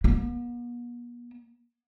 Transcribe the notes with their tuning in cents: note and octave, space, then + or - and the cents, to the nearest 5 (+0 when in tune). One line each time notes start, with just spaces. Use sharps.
B3 -45